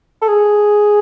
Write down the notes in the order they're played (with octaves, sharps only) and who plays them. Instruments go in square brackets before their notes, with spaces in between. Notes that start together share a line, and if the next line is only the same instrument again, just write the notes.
[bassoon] A4
G#4